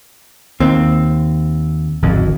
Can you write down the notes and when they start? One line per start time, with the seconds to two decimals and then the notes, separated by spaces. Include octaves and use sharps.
0.60 D#2 C4
2.03 D1 G#1 F2